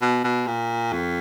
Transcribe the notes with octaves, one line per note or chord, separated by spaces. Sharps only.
B2
B2
A#2
F2